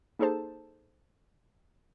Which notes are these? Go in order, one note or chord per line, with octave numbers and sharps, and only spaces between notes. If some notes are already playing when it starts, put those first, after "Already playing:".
A#3 D#4 G#4 A4 C5 A5